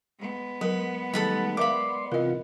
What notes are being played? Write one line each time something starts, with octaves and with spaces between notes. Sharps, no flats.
G#3 B3
F#3 A#4 B4
D#3 F#3 G3 A3 A4 F#5 B5
A#4 D5 E5 F5 B5 C6 D6
C3 E3 F4 A#4 D#5